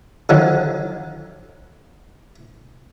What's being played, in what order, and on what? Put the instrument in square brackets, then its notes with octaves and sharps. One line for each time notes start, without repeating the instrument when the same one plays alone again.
[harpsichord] D3 D#3 F3 F#3